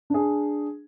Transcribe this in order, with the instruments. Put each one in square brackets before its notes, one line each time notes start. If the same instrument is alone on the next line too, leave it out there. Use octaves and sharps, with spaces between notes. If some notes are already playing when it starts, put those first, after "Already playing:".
[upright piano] D4 G#4